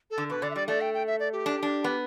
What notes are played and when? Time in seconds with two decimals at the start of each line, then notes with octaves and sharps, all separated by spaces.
0.11 A4
0.18 D3
0.30 B2 B4
0.42 D3 D5
0.50 E5
0.55 G3 D5
0.68 A3 D5
0.81 G5
0.94 G5
1.07 E5
1.20 D5
1.33 G4
1.46 D4
1.63 D4
1.84 B3